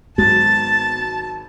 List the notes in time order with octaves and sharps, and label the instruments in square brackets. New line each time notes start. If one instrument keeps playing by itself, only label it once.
[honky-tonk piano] G#1 F#3 [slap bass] G#3 B3 [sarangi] A5 [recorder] A6